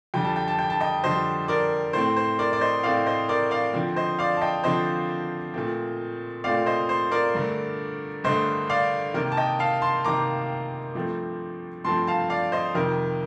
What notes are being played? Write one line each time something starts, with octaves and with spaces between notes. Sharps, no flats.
F2 D3 G3 G5
A5
G5
A5
G5
A5
D#5 G5
F2 D3 G3 C5 D#5
A#4 D5
A2 A3 C4 C5
C5
A#4 D5
D5
C5 D#5
A2 A3 C4 D5 F5
C5 D#5
A#4 D5
D5 F5
D3 F3 C4
C5 D#5
D5 F5
A5
D#5 G5
D3 F3 C4 C5 D#5
A#2 A3 C4
A#2 A3 C4 D5 F5
C5 D#5
C5
A#4 D5
G2 D3 A3
G2 D3 A3 C5 D#5
D5 F5
C3 D#3 A#3 A#4
A5
D#5 G5
F5 A5
A5 C6
C3 D#3 A#3 A#5 D6
G2 F3 A3 C4
G2 F3 A3 C4 A5 C6
F5 A5
D5 F5
C5 D#5
F2 C3 D#3 A#4